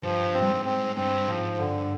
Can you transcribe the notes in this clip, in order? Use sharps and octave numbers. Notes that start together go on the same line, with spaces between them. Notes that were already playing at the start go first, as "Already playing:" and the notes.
G2 F3
C4
G2
G#2
C4
G2 C4
G#2 F3
G2 D3